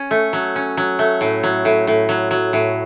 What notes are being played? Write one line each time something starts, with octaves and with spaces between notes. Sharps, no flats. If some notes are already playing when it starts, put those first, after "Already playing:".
Already playing: C#4
A3
F#3
C#4
F#3
A3
A2
F#3
A2
A2
F#3
F#3
A2